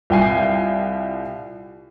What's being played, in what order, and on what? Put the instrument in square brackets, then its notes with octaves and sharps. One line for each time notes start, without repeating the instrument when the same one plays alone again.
[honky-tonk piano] C2 F4 G5 G#5 C7